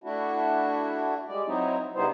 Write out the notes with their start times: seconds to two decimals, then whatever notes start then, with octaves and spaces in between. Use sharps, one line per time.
0.04 A3 D4 E4 F#4
1.28 G3 G#3 D5
1.46 F#3 C4 D#4 E4
1.95 C#3 G3 B3 D#4 E4 C5